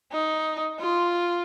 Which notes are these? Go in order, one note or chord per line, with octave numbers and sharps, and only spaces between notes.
D#4
F4